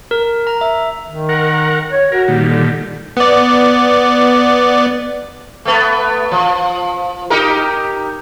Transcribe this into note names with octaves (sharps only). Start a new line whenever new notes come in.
A#4
A#5
E5
D#3
A#4 F#5
C#5
F#4 A#4
A#2 D#3 G3
D3
B3 D5
A3 B3
F3
D#4 G4 A#4